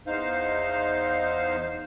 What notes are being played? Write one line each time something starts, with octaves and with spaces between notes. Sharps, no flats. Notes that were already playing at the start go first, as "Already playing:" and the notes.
E2 D#4 C5 F5